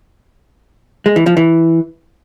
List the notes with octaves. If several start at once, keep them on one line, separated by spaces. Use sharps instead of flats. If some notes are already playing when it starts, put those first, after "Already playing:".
G#3
E3
F3
E3